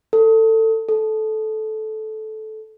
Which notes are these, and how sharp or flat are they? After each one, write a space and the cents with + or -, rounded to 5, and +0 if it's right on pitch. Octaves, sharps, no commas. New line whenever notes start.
A4 +20
A4 -15